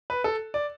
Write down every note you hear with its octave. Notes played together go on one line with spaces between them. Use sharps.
B4
A4
D5